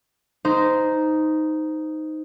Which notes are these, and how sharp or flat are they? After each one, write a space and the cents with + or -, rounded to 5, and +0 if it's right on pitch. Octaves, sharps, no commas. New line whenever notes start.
D#4 +0 C5 -15